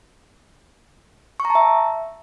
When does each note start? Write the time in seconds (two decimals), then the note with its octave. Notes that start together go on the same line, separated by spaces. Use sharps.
1.40 C#6
1.45 A#5
1.50 A5
1.55 E5